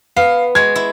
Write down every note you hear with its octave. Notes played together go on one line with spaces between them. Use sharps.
B3 F5
G#3 F#4 G#6
E4